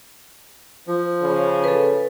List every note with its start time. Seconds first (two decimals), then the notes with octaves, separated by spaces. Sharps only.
0.87 F3
1.21 C#3
1.64 A4 B4